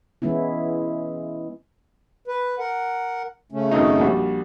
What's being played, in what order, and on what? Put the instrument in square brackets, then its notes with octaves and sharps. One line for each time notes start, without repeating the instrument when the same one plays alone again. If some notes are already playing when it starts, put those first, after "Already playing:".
[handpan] E3 G#3 B3 C#4 E4
[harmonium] B4
A#4 F#5
C#3 A3 C#4
[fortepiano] G#1 F#2 D#4
A#1 G3 F#4